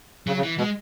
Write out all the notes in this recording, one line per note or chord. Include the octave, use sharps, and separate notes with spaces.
C#3 F#3
C#3
E3
B2 G#3